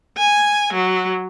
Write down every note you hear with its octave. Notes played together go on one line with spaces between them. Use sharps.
G#5
F#3